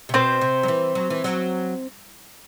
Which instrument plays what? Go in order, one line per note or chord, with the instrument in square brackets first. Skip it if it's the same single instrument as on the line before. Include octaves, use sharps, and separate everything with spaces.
[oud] C3
[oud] B2 [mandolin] C4 C5
[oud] C3
F#3
E3
F#3
E3
F#3